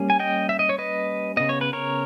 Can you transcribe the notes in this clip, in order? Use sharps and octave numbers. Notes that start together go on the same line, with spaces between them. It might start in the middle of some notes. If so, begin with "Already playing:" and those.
Already playing: G3 A#3 C#4
G#5
D#5 G5
E5
D#5
C#5
B4 D#5
C#3 G3 B3 D#5
C#5
B4
A#4 C#5